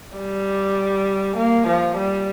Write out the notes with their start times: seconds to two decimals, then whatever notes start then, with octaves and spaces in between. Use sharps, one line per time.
0.17 G3
1.37 A#3
1.67 F3
1.97 G3